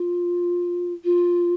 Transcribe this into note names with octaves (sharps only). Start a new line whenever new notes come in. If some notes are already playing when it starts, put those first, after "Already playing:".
Already playing: F4
F4